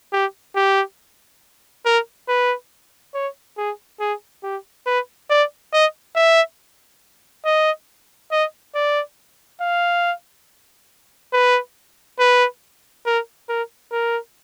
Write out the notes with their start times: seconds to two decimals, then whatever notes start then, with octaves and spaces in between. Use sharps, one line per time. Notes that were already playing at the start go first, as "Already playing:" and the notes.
0.13 G4
0.56 G4
1.86 A#4
2.28 B4
3.14 C#5
3.58 G#4
4.00 G#4
4.43 G4
4.87 B4
5.30 D5
5.73 D#5
6.16 E5
7.45 D#5
8.31 D#5
8.75 D5
9.61 F5
11.33 B4
12.19 B4
13.06 A#4
13.49 A#4
13.92 A#4